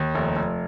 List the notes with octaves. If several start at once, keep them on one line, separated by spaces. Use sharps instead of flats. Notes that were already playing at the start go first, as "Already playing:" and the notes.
Already playing: D#2
F1
F1